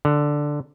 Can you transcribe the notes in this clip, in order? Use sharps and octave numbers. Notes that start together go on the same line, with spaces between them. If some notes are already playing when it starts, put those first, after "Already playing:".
D3